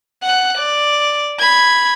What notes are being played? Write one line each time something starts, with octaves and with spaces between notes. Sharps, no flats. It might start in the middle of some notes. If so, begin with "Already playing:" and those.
F#5 F#6
D5
B5 G#6